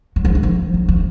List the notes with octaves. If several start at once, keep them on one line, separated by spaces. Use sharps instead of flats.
F#3
F3
E3
F3
F#3
F3